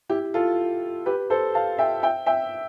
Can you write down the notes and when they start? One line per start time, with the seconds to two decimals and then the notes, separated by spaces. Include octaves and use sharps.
0.09 E4 G4
0.34 F4 A4
1.06 G4 B4
1.30 A4 C5
1.55 F5 A5
1.78 E5 G5
2.03 E5 G5
2.26 E5 G5